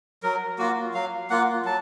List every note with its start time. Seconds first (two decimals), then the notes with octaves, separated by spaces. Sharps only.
0.23 F#3 A#4
0.59 A#3 F4 F#4
0.94 F#3 F5
1.30 A#3 F4 F#5
1.65 F#3 A5